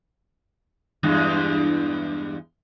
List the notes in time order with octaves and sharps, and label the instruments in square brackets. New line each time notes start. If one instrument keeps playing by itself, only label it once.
[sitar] E2 G2 G#3